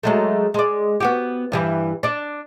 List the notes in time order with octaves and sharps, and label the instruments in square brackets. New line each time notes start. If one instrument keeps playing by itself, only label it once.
[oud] F#3 G#3 A3
G#3 D5
B3 F#4 G4
G2 E3 G3
D4 D5